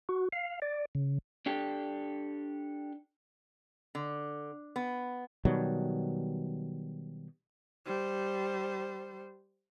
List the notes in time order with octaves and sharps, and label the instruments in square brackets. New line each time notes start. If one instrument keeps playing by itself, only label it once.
[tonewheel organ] F#4
F5
D5
C#3
[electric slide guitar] D4 G4 A4
[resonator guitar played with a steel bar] D3
B3
[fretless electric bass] B2 D#3 F#3 G3
[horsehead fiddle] G3 C5